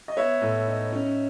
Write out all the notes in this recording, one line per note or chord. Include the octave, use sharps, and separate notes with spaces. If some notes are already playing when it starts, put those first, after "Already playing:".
D#5
B3 C#5 E5
A2
D#4
C#4